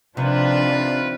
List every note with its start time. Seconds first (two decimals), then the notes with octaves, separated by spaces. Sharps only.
0.17 C3 D#3 F3 D4 F4 B4